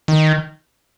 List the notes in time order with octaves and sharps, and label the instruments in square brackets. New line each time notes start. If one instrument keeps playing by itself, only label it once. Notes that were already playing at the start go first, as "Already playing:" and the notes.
[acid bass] D#3